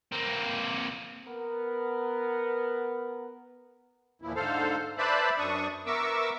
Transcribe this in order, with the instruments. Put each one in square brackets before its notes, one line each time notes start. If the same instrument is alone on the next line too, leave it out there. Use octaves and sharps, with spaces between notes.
[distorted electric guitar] A#3 C4
[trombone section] B3 A#4
[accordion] D#2 A#2 E3 F3 E4
G#2 D3 A4 C5 F5
B4 C5 D5 E5 A5 B5
F#2 D4 C#6 D#6
B3 A#4 E5 C#6 D6 E6